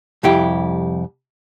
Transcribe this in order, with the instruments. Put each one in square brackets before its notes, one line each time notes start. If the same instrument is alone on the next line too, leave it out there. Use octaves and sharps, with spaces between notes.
[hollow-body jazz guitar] C2 F2 E4 G4